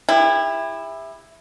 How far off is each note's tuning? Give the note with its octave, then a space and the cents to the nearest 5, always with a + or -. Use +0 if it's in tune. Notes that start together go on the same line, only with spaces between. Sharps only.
E4 +0 G4 +40